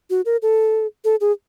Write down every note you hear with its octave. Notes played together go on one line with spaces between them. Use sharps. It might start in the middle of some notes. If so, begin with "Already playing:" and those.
F#4
A#4
A4
A4
G#4